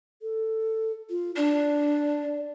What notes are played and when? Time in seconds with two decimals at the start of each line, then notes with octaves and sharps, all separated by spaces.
0.22 A4
1.10 F4
1.36 D4 D5